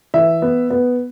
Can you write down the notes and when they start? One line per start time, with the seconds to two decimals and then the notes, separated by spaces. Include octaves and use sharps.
0.14 E3 E5
0.42 B3
0.70 B3